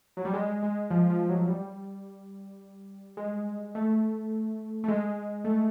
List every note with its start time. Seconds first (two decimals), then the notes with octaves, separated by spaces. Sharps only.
0.17 F#3
0.25 G3
0.33 G#3
0.63 G#3
0.91 F3
1.10 F3
1.29 F#3
1.48 G3
3.17 G#3
3.75 A3
4.84 A3
4.88 G#3
5.44 A3